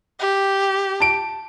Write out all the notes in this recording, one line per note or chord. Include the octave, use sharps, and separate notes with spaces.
G4
A5 D7